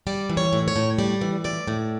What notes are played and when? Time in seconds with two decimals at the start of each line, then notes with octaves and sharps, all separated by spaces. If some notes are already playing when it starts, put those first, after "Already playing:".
0.07 G3 D5
0.29 E3
0.37 C#5
0.53 A2
0.68 C#5
0.76 A2
0.99 G3 D5
1.21 E3
1.44 A2 D5
1.68 A2